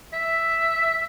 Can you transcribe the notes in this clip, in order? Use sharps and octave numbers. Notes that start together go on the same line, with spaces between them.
E5